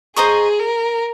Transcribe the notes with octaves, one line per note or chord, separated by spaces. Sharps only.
G#4 C5 D#5 A#5 C#6
A#4